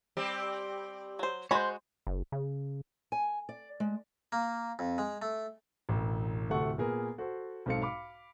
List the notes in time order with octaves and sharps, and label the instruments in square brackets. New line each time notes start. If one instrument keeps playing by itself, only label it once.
[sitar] G3 C4 G4
[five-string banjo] F#3 C5
[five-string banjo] G#3 F#4 B5 [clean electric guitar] C5 C#5
[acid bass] F#1
C#3
[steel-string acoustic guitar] G#5
D5
G#3
[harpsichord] A#3
F2
G#3
A3
[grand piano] E1 A1
D1 C3 A3 A4 F#5 C#6
A#2 B3 G#4 A#4
F#4 A4 C5
B1 G#2 C4 A4 F5 C#7
F5 B5 D6